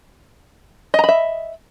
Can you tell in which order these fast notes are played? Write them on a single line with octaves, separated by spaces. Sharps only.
D#5 A#5 B5 E5